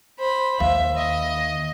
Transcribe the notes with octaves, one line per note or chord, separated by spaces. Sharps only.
C5 B5
D#2 E5 F5
D#5